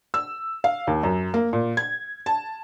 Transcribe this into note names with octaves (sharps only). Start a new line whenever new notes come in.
E6
F5
D#2
F#2
A#3
A#2
G#6
A5